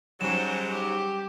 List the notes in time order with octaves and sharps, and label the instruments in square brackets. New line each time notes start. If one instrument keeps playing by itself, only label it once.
[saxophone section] G#2 F#3 [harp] G3 [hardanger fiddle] C#4 C5 [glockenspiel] E7
[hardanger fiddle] G4